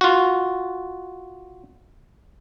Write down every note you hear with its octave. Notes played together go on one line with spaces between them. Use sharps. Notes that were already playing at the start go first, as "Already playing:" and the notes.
F4 F#4